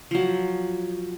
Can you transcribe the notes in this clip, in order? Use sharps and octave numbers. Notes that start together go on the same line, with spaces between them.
F3 F#3